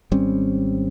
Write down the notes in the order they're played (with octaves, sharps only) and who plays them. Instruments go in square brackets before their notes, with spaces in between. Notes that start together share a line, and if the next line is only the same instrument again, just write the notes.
[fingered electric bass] G#1 G3 C4 C#4